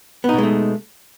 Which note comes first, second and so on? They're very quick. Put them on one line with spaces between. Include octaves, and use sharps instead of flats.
B3 D#4 B2 G#3 A3